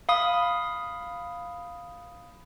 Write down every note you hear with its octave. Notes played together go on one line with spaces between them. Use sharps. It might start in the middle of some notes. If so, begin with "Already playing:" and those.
F5 B5 D#6